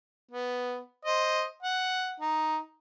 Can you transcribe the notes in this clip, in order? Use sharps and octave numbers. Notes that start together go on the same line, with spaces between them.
B3
C5 D#5
F#5
D#4